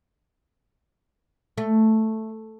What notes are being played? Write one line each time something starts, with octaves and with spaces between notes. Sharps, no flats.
A3